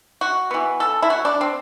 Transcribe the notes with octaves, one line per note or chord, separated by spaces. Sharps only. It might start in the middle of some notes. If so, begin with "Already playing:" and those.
F#4
E3 B3
A4
E4
F#4
D4
C4